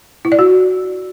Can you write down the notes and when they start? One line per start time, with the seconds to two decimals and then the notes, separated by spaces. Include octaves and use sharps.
0.25 E4
0.32 D5
0.39 F#4